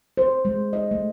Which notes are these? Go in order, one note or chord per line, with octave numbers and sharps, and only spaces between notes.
C5
G#3
D#5
A3